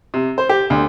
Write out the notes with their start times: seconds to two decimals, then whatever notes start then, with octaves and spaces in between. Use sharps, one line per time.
0.14 C3
0.38 C5
0.49 G4
0.70 D2